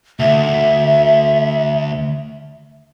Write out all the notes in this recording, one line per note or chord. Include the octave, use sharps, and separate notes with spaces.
D2 E5